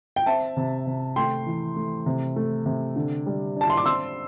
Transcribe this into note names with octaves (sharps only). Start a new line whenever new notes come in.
G5
C4 E5 A5
C3
C3
A3 G5 C6
E3
A3
C3
A3
C3
D3
G3
D4 A5
C6
D6
C4 C6 E6